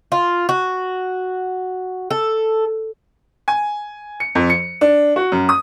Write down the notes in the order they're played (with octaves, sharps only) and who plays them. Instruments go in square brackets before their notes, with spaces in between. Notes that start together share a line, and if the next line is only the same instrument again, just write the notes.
[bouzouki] F4
F#4
A4
[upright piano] G#5
C#7
F2
C#7
D4
F#4
F#2
D#6